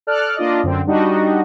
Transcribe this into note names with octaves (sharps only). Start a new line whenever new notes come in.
A4 D5 F6 F#6
A#3 D4 F4 D5 D#5
F#2 D3 C4
G3 D4 D#4 F#4 G4 D#5